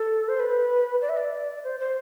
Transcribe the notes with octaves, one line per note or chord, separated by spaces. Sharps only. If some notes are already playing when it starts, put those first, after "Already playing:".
Already playing: A4
C5
B4
D5
E5
D5
C5
C5